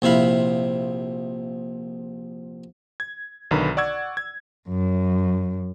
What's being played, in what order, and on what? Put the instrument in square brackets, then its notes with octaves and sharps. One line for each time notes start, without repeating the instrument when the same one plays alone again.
[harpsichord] A#1 C3 E4 F5 B5
[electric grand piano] G#6
B1 D3 D#3 B4 A#5 B5
D5 F#5 C#6 E6 G#6
G#6
[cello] F#2